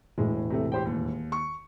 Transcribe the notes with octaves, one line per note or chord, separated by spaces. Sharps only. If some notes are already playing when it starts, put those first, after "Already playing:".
E1 A2 G#3
C3 A3
G4 C5 G5
D#2
C#6